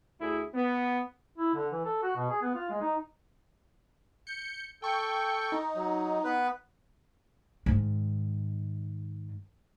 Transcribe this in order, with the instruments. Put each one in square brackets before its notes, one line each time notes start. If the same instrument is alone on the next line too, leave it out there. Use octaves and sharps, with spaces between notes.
[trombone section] D2 E4 G#4
B3
[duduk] E4
D3
E3
A4
F#4
B2
G#4
B3
F4
G#3
D#4
[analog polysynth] G6 C#7
[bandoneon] A4 [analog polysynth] G5 C#6 G6
[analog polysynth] D#4
[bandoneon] F#3
B3 B4
[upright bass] G#2 D#3